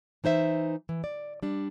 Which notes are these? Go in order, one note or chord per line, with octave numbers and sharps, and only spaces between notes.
E3 D#4 C5 E5
E3
D5
G3 D4